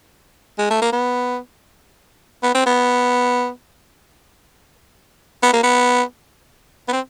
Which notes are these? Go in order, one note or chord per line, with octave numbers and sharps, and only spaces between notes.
G#3
A3
A#3
B3
B3
C4
B3
B3
A#3
B3
B3
C4